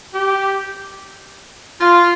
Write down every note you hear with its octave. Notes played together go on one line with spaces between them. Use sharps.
G4
F4